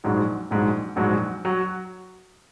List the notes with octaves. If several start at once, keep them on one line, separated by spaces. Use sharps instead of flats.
A#1 G#2 F#3
A#1 G#2 F#3
A#1 G#2 F#3
F#3